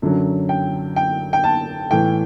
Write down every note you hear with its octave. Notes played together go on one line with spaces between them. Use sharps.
F#2 D3 F#3
G5
G5
G5
A5
A2 E3 G5